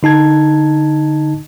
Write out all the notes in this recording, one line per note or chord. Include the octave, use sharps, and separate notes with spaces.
D3 D#4 A5 G#6